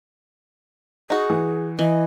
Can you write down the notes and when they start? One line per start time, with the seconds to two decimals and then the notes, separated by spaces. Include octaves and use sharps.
1.10 D#4 F#4 G#4
1.30 E3
1.79 E3 D#5